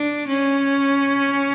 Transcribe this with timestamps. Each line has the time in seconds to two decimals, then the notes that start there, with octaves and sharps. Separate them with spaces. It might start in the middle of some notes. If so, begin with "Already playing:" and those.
Already playing: D4
0.28 C#4